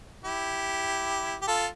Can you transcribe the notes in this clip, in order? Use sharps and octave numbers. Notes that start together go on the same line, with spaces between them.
E4 G4
G4
F4 A4